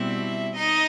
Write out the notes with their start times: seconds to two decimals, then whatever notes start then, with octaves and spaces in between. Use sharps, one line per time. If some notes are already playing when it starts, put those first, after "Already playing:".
Already playing: B2 G3 C4 E4 E5
0.56 D#4 D#5